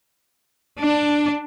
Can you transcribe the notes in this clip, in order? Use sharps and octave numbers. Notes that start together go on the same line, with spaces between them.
D4